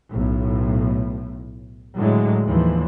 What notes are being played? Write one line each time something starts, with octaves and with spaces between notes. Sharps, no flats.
B1 A2
A2 D3 F#3 G#3
D#2 D3 E3 F3